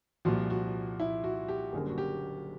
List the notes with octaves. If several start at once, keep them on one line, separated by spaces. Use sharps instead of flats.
C2 A#2 F3 F#4
F#4
E4
F#4
G4
F#1 F#2 D3 G3 A#3 G#4
F#4
G4